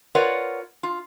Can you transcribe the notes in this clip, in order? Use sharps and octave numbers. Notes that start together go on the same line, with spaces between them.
F4 A#4 B4 C#5 D5 F#5
F4